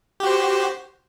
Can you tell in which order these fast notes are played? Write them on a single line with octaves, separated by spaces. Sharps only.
G4 F#4 C5